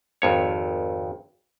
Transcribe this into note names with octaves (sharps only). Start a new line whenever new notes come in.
G#1 F2 C#5